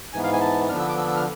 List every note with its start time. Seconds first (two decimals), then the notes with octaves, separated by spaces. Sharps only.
0.13 G#2 E3 B3 G#5
0.24 F5
0.33 G#5
0.41 A5
0.69 D3 F3 B3 D4 F6
0.79 E6
0.88 D6
0.98 E6
1.08 E6
1.16 F6